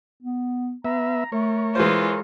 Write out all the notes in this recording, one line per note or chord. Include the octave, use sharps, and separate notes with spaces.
B3
B3 E5 A#5
A3 A#4 C#5
E3 G#3 F4 C5